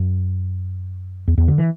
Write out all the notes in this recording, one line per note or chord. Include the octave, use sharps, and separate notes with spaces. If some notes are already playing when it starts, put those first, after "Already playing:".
Already playing: F#2
E2
E2
D3
E3